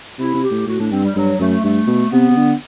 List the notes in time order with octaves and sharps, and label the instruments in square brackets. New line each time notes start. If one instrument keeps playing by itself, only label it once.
[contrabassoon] C3 [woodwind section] E4
[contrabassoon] C3
[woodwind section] G4
[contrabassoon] A2
[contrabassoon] A2 [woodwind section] F#4
[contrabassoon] A2 [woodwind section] D4
[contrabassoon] G2 [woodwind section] C4
[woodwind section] G3
[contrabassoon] G2 [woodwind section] F#3
[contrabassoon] F#2 [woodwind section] A3
[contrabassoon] G2 [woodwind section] A3
[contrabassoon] B2
[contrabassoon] C3 [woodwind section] B3
[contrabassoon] C3
D3